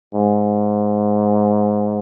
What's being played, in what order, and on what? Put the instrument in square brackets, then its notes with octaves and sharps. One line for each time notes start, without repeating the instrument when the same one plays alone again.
[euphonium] G#2